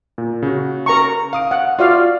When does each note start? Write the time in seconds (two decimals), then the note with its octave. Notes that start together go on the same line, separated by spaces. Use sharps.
0.18 A#2
0.42 C#3 F#4
0.86 A#4 A#5 C#6
1.33 F5 D#6 D7
1.51 F#5
1.79 F4 F#4 D5 F5